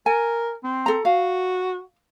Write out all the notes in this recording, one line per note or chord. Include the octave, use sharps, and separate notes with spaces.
A#4 G#5
C4
A4 A#5
F#4 F5